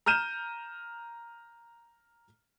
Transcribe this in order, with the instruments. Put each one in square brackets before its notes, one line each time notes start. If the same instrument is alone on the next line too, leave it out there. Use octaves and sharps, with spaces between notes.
[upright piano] A#5 F6 G6 D#7 E7